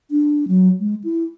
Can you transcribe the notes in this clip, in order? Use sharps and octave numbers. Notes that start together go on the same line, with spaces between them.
D4
F#3
G#3
E4